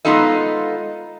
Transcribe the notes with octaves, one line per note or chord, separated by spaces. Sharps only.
G#3 B3 D#4 F4 A4 D#5